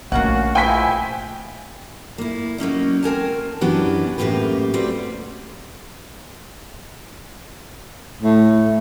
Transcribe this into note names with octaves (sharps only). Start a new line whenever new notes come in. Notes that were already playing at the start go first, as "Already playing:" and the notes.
A#1 A3 A#3 C#4 F#4 F#5
F3 G#3 E4 G5 G#5 B6
A#3 E4
F#3 A#3 C#4 D#4
C4 A#4 G#5 A5
F#2 E3 B3 D4 F#4 G4
F#2 A2 D3 A#3 G4 B4
G3 C4 F#4 B4
A2 A3